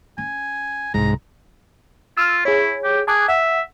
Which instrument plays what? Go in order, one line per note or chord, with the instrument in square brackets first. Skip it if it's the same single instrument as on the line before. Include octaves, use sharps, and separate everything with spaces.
[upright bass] C#4 [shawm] G#5
[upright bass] C2 [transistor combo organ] G#2 [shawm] A#5
[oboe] F4 [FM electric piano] E6 F6
[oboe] E4 [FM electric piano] G#4 C#5
[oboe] G4
[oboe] G#4 [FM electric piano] A5 D6 F#6
[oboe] E5 [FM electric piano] F#5